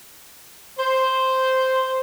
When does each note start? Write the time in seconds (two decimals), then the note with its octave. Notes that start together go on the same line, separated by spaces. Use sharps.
0.78 C5